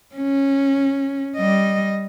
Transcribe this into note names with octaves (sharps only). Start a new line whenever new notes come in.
C#4
G3 D#5